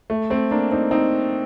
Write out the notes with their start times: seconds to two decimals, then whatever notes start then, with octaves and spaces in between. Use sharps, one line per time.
0.10 A3
0.30 A3 C4
0.51 A#3 D4
0.71 C4 D#4
0.91 C4 D#4